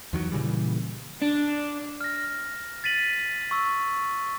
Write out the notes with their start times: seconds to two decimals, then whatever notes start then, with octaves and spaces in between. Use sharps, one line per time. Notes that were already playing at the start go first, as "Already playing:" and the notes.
0.13 E2 D#3 F#3
0.32 A#2 C#3 E3 G3
1.22 D4
2.01 F6 A#6
2.84 A6 B6 D#7 F#7
3.51 C#6 E6